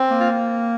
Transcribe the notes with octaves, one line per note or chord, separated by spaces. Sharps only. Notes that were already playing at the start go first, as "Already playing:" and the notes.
Already playing: C4
A#3
F4